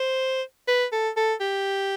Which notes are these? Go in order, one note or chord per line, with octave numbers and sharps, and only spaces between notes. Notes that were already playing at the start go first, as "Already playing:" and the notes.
Already playing: C5
B4
A4
A4
G4